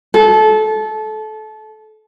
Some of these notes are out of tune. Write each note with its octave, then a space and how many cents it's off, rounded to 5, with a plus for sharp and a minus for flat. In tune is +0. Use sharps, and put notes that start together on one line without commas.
A4 -25